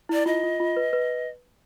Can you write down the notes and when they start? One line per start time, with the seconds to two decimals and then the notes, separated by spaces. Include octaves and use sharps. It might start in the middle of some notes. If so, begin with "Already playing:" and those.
0.09 E4 D5
0.26 F4 D#5
0.43 F4
0.60 F4
0.76 B4
0.93 B4